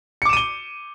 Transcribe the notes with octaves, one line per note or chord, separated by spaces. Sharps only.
D6 C#7 D#7 E7 G7